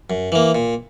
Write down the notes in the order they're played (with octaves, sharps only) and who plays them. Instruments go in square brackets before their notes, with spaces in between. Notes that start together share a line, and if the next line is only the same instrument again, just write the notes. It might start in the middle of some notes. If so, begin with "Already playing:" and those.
[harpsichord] F#2
E3 A#3
A#2